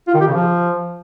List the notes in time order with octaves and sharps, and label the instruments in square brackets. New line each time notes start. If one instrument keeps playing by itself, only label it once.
[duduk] F4
D#3
G4
C#3
F3